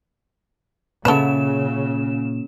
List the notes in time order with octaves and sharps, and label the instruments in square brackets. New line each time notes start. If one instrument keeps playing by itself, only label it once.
[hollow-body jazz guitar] A#2 C#5 E5 [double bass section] C#3 [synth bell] C#4 E7 [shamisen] A4 B4